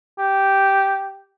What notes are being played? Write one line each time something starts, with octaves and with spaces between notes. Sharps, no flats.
G4